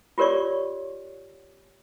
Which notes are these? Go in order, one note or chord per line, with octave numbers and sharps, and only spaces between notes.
F4 G4 A#4 C#5 D5 C#6